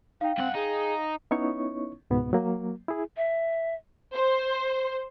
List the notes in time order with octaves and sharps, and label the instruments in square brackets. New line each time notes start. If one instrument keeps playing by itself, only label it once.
[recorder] D#4 [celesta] F5 G5
[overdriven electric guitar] G2 F#5 [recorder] C4
[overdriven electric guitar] D#4 [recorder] G#4
[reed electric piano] B3 C#4 D#4 E4 C#5 C#6
C#2 G#2 B2 B3
F#3 A#3
E4 G#4
[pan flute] E5
[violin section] C5